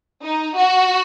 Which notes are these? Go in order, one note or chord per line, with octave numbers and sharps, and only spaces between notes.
D#4
F#4